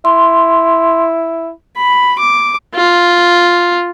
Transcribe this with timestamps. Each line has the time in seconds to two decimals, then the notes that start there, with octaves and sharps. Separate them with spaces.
0.05 E4 C6
1.77 B5
2.19 D6
2.75 F4